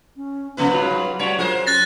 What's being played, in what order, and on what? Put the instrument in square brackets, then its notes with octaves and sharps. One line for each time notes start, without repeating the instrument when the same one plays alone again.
[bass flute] C#4
[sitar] C3 F3 B4 [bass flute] B3
[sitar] G#2 [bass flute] F#3 [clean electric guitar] F4 B4
[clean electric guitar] G3 D4 F#4 [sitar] C#5 [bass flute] F#5
[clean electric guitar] F#3 [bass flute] F4 [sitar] G#4 A#4 C5
[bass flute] C#4 [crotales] F#6 A6 A#6